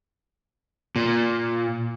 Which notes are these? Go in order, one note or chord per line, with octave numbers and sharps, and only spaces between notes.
A#2